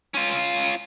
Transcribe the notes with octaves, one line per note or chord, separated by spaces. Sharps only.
C#4 F4